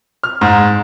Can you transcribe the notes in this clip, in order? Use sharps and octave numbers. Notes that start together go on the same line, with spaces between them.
F6
G#2